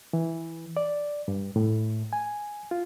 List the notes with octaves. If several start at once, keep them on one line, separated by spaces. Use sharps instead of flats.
E3
D5
G2
A2
G#5
F4